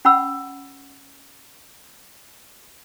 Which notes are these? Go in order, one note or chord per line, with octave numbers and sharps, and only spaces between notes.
C#4 F#5 B5 E6